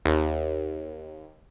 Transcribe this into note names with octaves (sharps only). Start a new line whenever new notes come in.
D#2